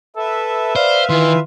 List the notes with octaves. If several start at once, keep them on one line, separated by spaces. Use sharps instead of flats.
A4 B4 E5
C5 D5 F5
D#3 E3 F4